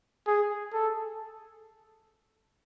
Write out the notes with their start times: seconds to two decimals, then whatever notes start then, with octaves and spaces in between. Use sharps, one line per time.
0.27 G#4
0.73 A4